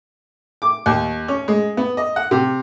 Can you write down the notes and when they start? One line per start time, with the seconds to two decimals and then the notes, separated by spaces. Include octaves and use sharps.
0.62 D6
0.86 D#2
1.28 C#4
1.48 G#3
1.77 B3
1.97 D#5
2.16 F#5
2.31 C3